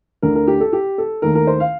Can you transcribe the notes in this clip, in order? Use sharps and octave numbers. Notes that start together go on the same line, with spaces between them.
D2 D3 A3 A#4
A#4
G4
A4
G4
A4
D#2 D#3 A3 A#4
A#4
C5
F5